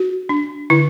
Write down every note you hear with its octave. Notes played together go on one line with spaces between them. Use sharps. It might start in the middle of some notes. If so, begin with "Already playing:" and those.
Already playing: F#4
D4
D3 E4